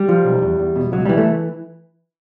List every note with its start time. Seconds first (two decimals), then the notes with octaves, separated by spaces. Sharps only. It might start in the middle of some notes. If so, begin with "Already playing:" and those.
Already playing: G3
0.09 F3
0.24 B1
0.42 E2
0.59 E2
0.76 B2
0.92 C#2 F#3
1.05 E3 G3
1.18 A3